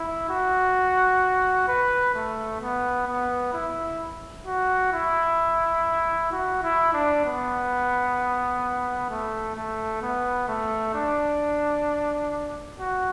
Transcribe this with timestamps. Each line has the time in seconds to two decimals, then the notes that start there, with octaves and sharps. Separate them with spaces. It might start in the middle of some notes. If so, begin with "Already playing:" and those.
Already playing: E4
0.29 F#4
1.68 B4
2.15 A3
2.61 B3
3.07 B3
3.53 E4
4.46 F#4
4.92 E4
6.32 F#4
6.62 E4
6.94 D4
7.25 B3
9.10 A3
9.56 A3
10.02 B3
10.48 A3
10.95 D4
12.80 F#4